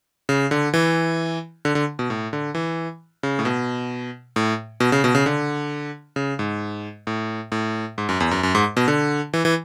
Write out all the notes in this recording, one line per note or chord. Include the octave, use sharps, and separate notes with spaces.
C#3
D3
E3
D3
D3
B2
A2
D3
E3
C#3
A2
B2
A2
B2
C#3
B2
C#3
D3
C#3
G#2
A2
A2
G#2
F#2
E2
F#2
F#2
G#2
B2
D3
E3
E3